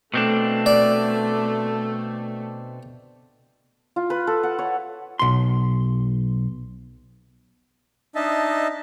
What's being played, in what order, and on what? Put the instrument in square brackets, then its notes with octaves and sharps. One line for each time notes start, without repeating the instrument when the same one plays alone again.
[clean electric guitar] B2 C4 D4 [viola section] A3
[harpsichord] D5
[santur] F4
B4
A4
F#5
C#5
[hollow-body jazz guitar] B1 C6
[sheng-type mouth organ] D4 D#4 D#5 E5 A5